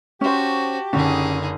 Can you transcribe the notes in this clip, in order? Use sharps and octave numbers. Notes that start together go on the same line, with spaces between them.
C#4 F#4 G4 C5 A5
F#1 D3 C#4 D#4 G#4